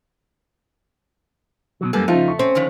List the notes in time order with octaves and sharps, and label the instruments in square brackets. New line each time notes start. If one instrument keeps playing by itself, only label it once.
[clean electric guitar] B2 D#3 F#3
[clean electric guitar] F#2 G3 A#3 [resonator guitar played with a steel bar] A4 B4 G#5
[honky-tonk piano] C#3 F3 [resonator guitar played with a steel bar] A3 [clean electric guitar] D#4 F4
[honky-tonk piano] C#6
[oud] C4 [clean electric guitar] C#4
[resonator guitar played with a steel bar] D3 D#3 F3